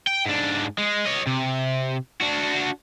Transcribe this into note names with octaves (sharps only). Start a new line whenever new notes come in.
G5
G#2 D4
G#3
C#5 D#5
C3
D4 F#4